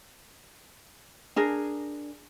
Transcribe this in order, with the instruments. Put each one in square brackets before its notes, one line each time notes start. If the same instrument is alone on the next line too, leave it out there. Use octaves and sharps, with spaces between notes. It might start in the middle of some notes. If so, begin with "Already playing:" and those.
[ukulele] D4 G#4 A#4